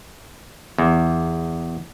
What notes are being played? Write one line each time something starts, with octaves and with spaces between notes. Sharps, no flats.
E2